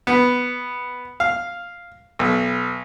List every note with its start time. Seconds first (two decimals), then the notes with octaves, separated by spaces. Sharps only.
0.07 B3
1.20 F5
2.19 B1